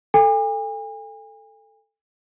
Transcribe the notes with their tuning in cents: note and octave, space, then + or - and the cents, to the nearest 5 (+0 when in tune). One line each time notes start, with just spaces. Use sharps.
A4 +0 G#5 -45